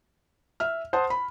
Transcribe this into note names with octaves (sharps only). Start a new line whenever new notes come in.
E5 F6
C5 F#5 A5 C6 D#6
B5